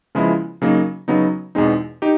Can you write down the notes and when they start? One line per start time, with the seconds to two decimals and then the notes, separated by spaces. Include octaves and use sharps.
0.15 C#3 F3 G#3 B3 E4
0.62 C#3 F#3 A#3 D#4
1.08 C#3 F#3 B3 D#4
1.55 E2 B2 G#3 C4 D#4
2.02 D#4 G4